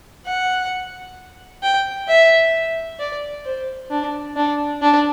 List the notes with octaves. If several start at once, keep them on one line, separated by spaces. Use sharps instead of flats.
F#5
G5
E5
D5
C5
D4
D4
D4